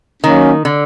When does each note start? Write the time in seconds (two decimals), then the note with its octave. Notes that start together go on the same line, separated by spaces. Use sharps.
0.23 D#3 F#3 A#3 C#4
0.65 D3